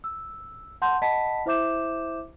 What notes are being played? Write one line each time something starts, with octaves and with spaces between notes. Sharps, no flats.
E6
F#5 A5 C6 G6
D#5 F#5 A5 B5 B6
E4 C5 E5 D6 G6 E7